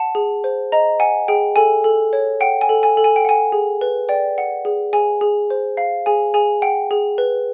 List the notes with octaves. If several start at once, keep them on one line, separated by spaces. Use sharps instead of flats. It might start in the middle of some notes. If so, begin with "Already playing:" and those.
Already playing: F#5 A5
G#4
C5
D#5 A#5
F#5 G#5
G#4 G5
A4 G#5
A4
C#5
F#5 G5
G#5
A4
G#5
A4
G#5
G5
F#5 G#5
G#4
B4
D5 G5
F#5
G#4
G#4 G#5
G#4
C5
F5
G#4 G#5
G#4 G#5
F#5 G5
G#4
B4